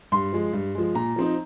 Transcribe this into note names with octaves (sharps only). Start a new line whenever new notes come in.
G2 C6
F3 G#3
G2
F3 G#3
A#2 A#5
F3 C4 D#4